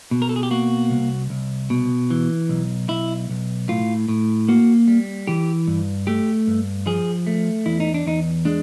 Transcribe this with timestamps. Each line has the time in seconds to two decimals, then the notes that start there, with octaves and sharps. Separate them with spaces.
0.11 B2
0.22 A#4
0.29 A4
0.36 G#4
0.43 G4
0.51 A#3 F#4
0.90 C2
1.30 C2
1.70 B2
2.10 E3
2.49 B1
2.89 B1 E4
3.29 B1
3.69 A2 F4
4.09 A2
4.49 A#3 F#4
4.87 G3
5.27 E3 G4
5.67 G2
6.07 A3 G4
6.47 G2
6.87 F3 G#4
7.27 A3
7.66 E2 E4
7.80 D#4
7.94 D4
8.06 E2 D#4
8.45 G#3 D4